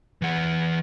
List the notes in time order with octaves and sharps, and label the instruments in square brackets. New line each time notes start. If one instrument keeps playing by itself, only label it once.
[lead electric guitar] E3 F#5